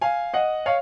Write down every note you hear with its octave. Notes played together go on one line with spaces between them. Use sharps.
F5 G#5
D#5 F#5
C#5 F5